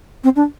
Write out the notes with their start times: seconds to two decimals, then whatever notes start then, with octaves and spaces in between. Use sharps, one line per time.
0.24 C4
0.36 D4